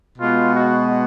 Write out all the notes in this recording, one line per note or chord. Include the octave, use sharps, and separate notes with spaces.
B2 G#3 B3 F4
F#4